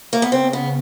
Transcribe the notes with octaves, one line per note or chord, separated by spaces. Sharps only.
A#3
B3
C#3 C4
B3